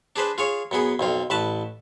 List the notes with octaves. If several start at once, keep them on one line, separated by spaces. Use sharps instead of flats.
D4 G#4 B4 C5
F4 G#4 C#5
F#2 B3 G#4
B1 F2 F4
A1 B4 A5